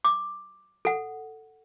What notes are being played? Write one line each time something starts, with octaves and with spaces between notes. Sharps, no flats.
D6
A4 F#5